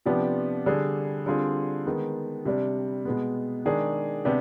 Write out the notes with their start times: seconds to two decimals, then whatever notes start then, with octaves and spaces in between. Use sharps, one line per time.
0.06 C3 F3 B3 D4 G4
0.66 D3 G3 D4 G#4
1.26 D3 G3 C4 F4 G#4
1.86 D#3 G#3 B3
2.45 C3 G3 D4
3.05 B2 G#3 B3
3.65 D#3 G#3 D4 G#4
4.25 C3 B3 D4 G4